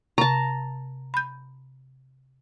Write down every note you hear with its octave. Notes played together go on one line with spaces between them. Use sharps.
C3 A5 A#5
B5 G6